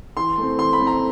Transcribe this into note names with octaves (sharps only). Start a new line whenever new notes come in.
E3 C6
A3 C4
E3 C6
B5
A3 C4
A#5